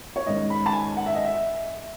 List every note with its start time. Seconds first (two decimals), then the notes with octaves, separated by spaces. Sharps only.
0.16 C#5
0.26 G#2 D#3 G#3 C#4 D#5
0.50 B5
0.66 A5
0.73 G#5
0.97 F#5
1.06 E5
1.15 D#5
1.25 E5